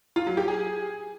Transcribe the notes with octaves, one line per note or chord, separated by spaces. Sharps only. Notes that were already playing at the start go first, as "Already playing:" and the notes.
F4
F#3
G4
G#4